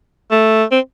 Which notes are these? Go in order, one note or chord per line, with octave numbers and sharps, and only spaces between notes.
A3
C4